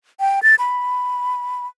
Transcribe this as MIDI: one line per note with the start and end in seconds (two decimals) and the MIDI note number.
0.20 0.40 79
0.43 0.55 93
0.59 1.66 83